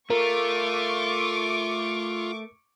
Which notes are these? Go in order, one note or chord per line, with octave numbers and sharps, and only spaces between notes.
A3 F4 A#4 C#6 D6